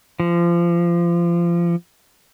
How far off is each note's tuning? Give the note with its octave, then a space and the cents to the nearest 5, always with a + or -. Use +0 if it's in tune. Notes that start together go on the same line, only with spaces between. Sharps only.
F3 -25